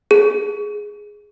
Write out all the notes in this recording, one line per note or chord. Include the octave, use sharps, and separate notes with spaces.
G#4